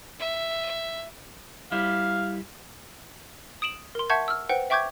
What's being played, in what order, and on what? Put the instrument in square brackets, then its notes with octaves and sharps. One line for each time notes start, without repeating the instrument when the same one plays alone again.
[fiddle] E5
[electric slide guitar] G3 E4 [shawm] F5
[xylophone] D#6 D7 E7 F#7
A#4 C6
E5 F#5 A5 C#6 G6 G#6
E6 F6
B4 C5 F#5 G5
E5 G5 C#6 D6 G6 G#6